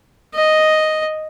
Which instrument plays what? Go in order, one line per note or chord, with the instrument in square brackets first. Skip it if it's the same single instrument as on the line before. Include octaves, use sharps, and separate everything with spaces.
[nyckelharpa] D#5